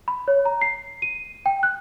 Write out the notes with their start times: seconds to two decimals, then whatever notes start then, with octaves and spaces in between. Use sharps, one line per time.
0.08 B5
0.28 C#5
0.45 A#5
0.61 C7
1.02 D#7
1.46 G5
1.63 F#6